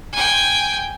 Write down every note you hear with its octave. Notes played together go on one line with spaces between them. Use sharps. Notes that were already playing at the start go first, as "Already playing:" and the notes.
G5 G#5